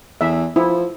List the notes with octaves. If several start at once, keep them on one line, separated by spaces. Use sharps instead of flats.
E2 E5
F3 E4